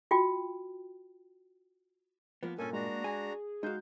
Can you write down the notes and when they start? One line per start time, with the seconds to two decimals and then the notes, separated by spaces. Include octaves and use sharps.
0.11 F4 F#4 G5
2.43 F3 A#3 B3
2.58 G2 A#2 A#3 C#4 A4 G#5
2.73 G#3 D4 F#4 A#5
3.04 G#4 G#5
3.63 G#3 D#4 F#4 F5 G6